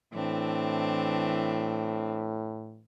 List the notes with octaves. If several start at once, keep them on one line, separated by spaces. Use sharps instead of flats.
A2 E3 C4 D4